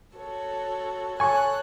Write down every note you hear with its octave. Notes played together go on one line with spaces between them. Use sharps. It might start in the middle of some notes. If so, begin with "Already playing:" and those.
F#4 A4 C#5
A4 C#5 G#5 C#6 F#6